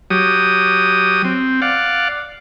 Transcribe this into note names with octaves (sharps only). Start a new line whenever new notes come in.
F#3 G4 D#6
C4
D5 F5 F#5